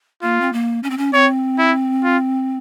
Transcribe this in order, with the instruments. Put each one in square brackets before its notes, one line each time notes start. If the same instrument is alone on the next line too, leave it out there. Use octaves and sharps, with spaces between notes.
[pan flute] A#3 [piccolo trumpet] F4
[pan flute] C4
A#3
C#4
C4
C#4
[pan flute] C4 [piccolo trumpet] C#5
[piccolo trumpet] E4
F4